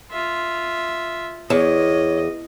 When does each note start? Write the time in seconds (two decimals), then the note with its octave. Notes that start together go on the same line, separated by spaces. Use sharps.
0.12 F4 E5
1.50 E2 C#5 D#5